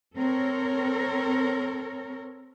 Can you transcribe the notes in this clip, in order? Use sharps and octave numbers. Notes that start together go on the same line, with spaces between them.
C4 A4 A#4 C#5